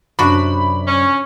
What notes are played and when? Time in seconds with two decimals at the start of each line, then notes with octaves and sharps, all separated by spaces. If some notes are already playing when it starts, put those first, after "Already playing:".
0.19 F#2 C3 D4 F#4 D5 B5
0.86 C#4